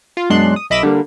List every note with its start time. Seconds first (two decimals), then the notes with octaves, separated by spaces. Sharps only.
0.17 F4
0.30 F#2 B2 G#3 D4 C6 F#6
0.56 D#6
0.70 B1 D#5 E5 B5 D6 E7
0.83 D3 G3 A#3